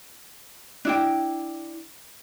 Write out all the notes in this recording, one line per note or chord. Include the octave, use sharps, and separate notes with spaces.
D4 E4 G5